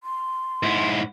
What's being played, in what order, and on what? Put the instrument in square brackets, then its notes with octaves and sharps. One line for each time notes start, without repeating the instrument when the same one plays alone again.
[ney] C6
[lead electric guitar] G#2 E4